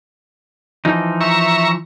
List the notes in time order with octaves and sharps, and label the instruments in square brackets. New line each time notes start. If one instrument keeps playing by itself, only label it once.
[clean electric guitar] E3 F3 D#4
[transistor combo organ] E5 A#5 C#6